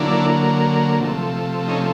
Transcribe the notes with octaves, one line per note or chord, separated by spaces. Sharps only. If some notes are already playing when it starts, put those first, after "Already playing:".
Already playing: D3 F#3 A#3 D4 E4
C3 F3 A3
C#4 D#4